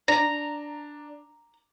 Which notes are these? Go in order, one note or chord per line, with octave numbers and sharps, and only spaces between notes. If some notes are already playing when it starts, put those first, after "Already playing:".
D4 A#5